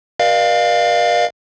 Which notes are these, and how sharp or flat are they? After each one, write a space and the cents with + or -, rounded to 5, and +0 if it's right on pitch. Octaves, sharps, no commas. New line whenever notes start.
A#4 +40 D5 +45 F5 +0